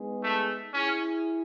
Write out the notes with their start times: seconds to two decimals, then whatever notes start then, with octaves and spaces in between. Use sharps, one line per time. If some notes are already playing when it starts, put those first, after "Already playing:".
Already playing: G#3 B3 D#4 G#4
0.23 A3
0.73 C#4 E4 G#4